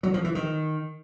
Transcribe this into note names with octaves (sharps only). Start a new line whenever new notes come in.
F#3
F3
E3
D#3